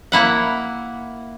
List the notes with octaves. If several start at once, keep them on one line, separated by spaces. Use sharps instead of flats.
A#3 E4 F#5